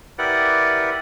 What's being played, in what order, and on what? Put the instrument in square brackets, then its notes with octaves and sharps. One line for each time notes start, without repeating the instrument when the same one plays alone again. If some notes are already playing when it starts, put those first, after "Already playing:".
[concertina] E4 G4 A#4 B4 D5 F#5